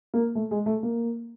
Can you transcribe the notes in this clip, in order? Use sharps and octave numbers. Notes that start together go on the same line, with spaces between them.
A#3
A3
G#3
A3
A#3